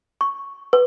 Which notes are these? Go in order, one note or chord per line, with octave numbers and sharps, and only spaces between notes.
C#6
B4